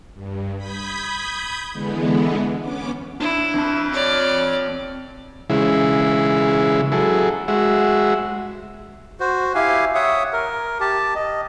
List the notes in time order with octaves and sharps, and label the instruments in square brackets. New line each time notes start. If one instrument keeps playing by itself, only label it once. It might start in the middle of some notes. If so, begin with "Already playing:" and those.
[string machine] G2
B5 D#6 G6 G#6 B6
D3 E3 G#3 B3
B3 C#4 D6
[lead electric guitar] D4 [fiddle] E4
[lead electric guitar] C4 A5
[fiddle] C#5 D5
[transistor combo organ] C#3 E3 G#3 E4
F#3 E4 G#4 A4
G#3 F#4 E5
[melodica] F#4 C5
E4 G4 F5 G#5
C#5 E5 F#5 D#6
A#4
G4 A5
D#5